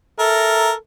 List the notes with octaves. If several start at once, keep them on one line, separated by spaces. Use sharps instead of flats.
A4 A#4 E5